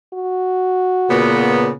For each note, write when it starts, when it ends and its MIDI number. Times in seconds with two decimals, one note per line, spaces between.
0.14 1.44 66
1.09 1.70 46
1.09 1.70 49
1.09 1.70 59